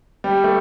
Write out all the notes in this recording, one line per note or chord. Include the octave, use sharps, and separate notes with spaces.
G3
A3